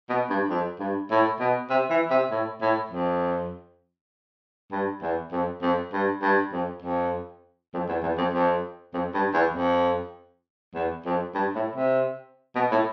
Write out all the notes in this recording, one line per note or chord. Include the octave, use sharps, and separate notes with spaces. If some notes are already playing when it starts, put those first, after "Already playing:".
B2
G2
F2
G2
A2
B2
C3
E3
C3
A2
A2
F2
G2
E2
F2
F2
G2
G2
F2
F2
F2
E2
E2
F2
F2
F2
G2
E2
F2
E2
F2
G2
A2
C3
B2
A2